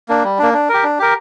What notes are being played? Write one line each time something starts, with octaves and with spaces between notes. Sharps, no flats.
A#3 D4
G3
A#3 D4
D4
G4 A#4
D4
G4 A#4